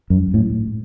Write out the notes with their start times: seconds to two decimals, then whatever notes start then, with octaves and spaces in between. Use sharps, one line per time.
0.10 F#2
0.34 A2